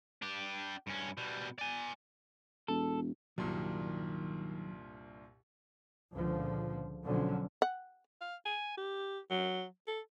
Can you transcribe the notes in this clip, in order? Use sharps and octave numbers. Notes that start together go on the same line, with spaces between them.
D4 G4
G2 C#4
B2 G3
D5 G#5
E1 A4
C2 G2 A#2 D#3 F#3
C#2 A#2 D3 F3
B1 D3 F3 F#3 C#4
F#5
F5
G#5
G4
F#3
A4